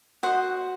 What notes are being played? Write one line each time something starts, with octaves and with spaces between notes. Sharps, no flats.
F#4 C5 D#5 F#5